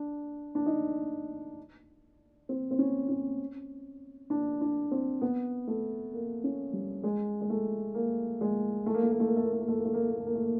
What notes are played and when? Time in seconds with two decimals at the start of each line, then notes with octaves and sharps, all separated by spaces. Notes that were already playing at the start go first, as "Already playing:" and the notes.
Already playing: D4
0.55 D4
0.66 D#4
2.49 C4
2.71 C4
2.79 C#4
3.09 C#4
4.30 D4
4.61 D4
4.91 C4
5.21 B3
5.67 A3
6.14 A#3
6.44 C#4
6.73 G3
7.04 G#3
7.41 G#3
7.50 A3
7.95 A#3
8.41 G#3
8.86 A3
8.94 A#3
9.03 A3
9.11 A#3
9.20 A3
9.27 A#3
9.36 A3
9.44 A#3
9.52 A3
9.61 A#3
9.68 A3
9.78 A#3
9.85 A3
9.94 A#3
10.03 A3
10.10 A#3
10.18 A3
10.27 A#3
10.35 A3
10.44 A#3